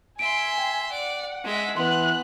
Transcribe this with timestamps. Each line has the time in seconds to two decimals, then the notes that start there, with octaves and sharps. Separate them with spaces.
0.19 E5 G#5 C6 D7
0.58 G5
0.91 D5 F#5
1.44 G#3 E5
1.77 E3 B3 C6 F#6